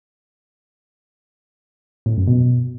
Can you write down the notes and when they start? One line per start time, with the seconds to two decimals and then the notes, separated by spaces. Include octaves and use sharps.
2.06 A2
2.17 F#2
2.27 B2